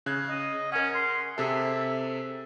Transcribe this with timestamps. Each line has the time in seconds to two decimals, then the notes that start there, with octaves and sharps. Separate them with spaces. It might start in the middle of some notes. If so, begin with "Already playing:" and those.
0.06 C#3 F#6 G#6
0.30 D#5
0.72 C#4 A#4 F#5
0.95 C6
1.38 C3 G#4 A4 E5